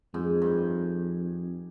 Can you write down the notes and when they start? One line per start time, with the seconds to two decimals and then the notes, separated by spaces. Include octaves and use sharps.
0.14 F2 G#2
0.42 G2